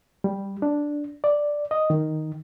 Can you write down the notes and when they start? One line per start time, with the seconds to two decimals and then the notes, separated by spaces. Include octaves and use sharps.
0.24 G3
0.62 D4
1.24 D5
1.71 D#5
1.90 D#3